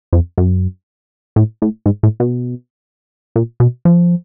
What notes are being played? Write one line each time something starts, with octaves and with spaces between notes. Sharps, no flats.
F2
F#2
A2
A2
G#2
A2
B2
A#2
B2
F3